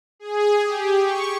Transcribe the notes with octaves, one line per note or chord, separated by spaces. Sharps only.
G#4
G4
C#6